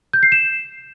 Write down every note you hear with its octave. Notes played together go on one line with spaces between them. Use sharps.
G6
C7
E7